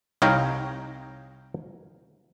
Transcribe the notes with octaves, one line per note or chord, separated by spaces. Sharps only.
C2 D#4 C#5 F5 G5 A#5